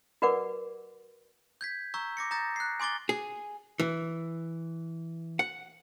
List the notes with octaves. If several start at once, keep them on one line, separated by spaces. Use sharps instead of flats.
F#4 A#4 B4 D5 F#5 D6
G6 G#6 B6
A#5 C#6 E6 G6
D6 A#6 C#7
A#5 D#6 G6 A6 A#6
F#6 C7
G#5 C6 D6 A6 G7
G#4
E3
F#5